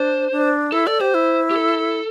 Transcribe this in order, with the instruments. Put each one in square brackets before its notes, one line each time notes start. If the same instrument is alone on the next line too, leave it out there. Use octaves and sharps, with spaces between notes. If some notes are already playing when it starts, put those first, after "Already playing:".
Already playing: [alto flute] D4 [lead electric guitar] C5
[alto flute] D4
[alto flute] E4 [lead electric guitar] A4
[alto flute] A4 [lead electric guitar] D5
[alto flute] G4 [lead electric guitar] C5
[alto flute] E4
[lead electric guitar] G4
A4